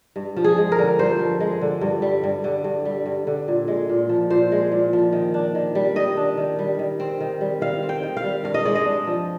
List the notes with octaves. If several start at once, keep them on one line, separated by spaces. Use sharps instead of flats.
G2
F3
G#4
G#3
A#4
D3
G2 C5
F3
G#3
D3
G2
G3
G2
D3
G2
G3
G2
D3
A#2
G#3
A#2
F3
A#2 C5
G#3
A#2
F3
D#3
D4
D#3
G3
D#3 D#5
D4
D#3
G3
D#3
C4
D#3
G3
D#3 F5
C4
G5
D#3
F5
G3
G2 F5
D#5
G#3 D5
D#5
D4
F3